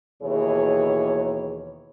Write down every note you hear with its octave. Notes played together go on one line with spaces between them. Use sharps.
D#2 B2 E3 G#4 C#5